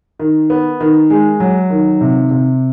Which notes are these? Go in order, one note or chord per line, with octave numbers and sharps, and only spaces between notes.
D#3
B3
D#3
G#3
F#3
D#3
C3
C3